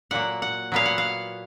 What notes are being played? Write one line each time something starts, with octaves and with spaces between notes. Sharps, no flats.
A#2 F#3 A#3 F#5
F#5
A#2 F#3 B3 F5
F#5
F5